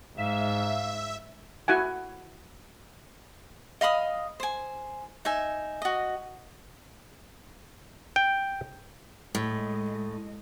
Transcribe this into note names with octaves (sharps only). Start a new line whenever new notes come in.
G#2 E5 F5
E4 F#4 F#5 G#5
D#5 F5 B5 D#6
C5 G#5
D#4 E5 G#5
F#4 D#5
G5
A2 G#3 D#5